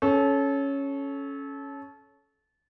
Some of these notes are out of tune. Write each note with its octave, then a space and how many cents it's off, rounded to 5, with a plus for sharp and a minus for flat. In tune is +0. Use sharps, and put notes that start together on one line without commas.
C#4 +0 A4 -25